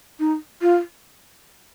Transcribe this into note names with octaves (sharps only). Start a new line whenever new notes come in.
D#4
F4